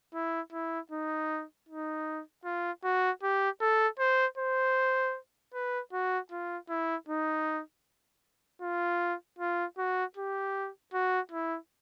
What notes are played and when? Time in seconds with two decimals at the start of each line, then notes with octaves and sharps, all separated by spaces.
0.14 E4
0.52 E4
0.91 D#4
1.69 D#4
2.45 F4
2.84 F#4
3.23 G4
3.61 A4
3.99 C5
4.38 C5
5.54 B4
5.93 F#4
6.31 F4
6.69 E4
7.08 D#4
8.61 F4
9.39 F4
9.78 F#4
10.16 G4
10.93 F#4
11.31 E4